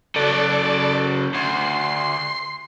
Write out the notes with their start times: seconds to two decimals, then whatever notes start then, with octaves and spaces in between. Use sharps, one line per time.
0.16 C#3 F#3 A4 D5
1.35 D2 C6